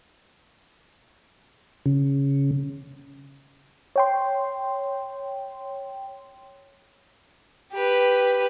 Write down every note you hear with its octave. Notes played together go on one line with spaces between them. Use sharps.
C#3
C#5 G5 C6
G4 B4